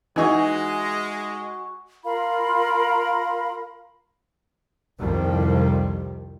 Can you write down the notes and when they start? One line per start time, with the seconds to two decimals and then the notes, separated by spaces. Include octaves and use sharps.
0.16 E3 G#3 D#4 F#4 G#4
2.04 F4 A#4 F5 B5
5.00 C2 F2 D#3 F3 G3